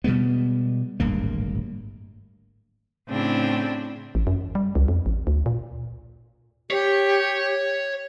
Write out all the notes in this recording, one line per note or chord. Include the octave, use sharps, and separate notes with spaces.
B2 G3 G#3 B3
D1 G#1 G2 A#3
A2 C#3 C4 D4 E4
A1
F#2
G3
C#2
F2
A1
D2
A#2
G4 C#5